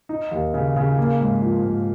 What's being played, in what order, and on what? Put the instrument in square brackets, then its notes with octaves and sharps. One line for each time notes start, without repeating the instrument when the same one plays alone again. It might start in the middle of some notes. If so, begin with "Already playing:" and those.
[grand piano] D#4
D#2
C#3
C#3
A#3
G#2
F3
G#2